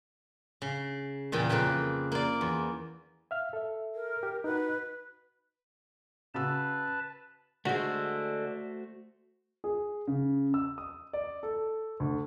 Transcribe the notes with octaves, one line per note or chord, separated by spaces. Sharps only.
C#3
E2 A#2 C#3 G5 G#5
F2 C#3 A#3 B4 G5
A#3 D5
E2
E5 F5 F6
A4 E5
A#4
G4
D#4 F#4 B4
C#3 F#4 B4 A5 E6
D3 G#3 A3 F#4 C5
G#4
C#3
E6
D#6
D5
A4
D2